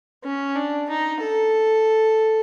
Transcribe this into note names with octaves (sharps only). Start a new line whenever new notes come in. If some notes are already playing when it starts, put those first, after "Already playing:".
C#4
D4
D#4
A4